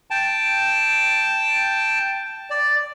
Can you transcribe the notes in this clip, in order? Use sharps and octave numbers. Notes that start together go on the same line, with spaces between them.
G5 A5
D5